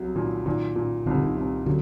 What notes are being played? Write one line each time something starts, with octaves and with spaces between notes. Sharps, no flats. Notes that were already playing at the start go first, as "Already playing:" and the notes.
Already playing: C2 F#3
A#2 D#3
A#2 D#3
A#2
C2 D#3
D3
D#3
C2
D3 F#3